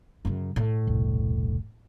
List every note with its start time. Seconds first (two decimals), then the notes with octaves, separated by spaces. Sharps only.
0.25 F#2 C#3
0.56 A2
0.87 E1 C2